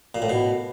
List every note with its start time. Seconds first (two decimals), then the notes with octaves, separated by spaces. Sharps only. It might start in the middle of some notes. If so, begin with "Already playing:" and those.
0.15 A#2
0.22 A2
0.30 B2